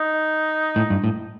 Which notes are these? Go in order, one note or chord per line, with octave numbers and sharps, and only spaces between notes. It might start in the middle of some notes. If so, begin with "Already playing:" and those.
Already playing: D#4
A2
G2
A2